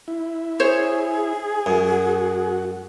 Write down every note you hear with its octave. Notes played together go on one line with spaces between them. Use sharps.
E4
G#4 C5 C#5
F#2 F#4